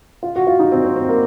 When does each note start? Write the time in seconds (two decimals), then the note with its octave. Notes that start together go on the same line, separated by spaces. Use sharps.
0.23 F4
0.36 F#4
0.47 F4
0.59 D#4
0.72 C4
0.84 C4
0.96 C4
1.09 A#3